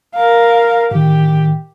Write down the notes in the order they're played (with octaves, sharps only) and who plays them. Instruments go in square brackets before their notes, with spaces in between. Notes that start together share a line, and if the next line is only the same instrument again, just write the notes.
[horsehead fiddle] A#4 F5
[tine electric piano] A2 D#3 [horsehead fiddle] G4